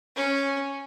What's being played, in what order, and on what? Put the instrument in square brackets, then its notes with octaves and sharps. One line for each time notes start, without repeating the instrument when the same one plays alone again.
[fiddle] C#4